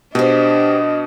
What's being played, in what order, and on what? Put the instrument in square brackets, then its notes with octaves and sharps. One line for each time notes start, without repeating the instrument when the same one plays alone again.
[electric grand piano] B2 [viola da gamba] D4 [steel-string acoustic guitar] G4 C5 [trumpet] D#5